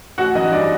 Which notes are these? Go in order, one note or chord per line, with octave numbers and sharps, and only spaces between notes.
A1 F#4 F#5
E3 D#4 D#5
G2 D4 D5